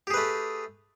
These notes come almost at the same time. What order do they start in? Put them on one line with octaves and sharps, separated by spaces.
G4 G#4 B4 A3